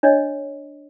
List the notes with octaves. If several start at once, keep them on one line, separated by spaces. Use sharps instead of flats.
D4 C#5 D#5